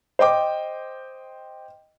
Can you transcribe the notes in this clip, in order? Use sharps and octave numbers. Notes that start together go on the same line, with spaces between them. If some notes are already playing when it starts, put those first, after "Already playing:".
C5 D#5 G5 D6